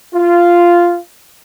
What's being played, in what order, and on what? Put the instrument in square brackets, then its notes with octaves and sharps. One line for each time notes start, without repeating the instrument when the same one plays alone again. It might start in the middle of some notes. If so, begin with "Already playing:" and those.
[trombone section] F4